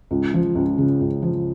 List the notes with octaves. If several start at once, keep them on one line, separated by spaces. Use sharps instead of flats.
C#2
F3
C#2
C#3
C#2
F3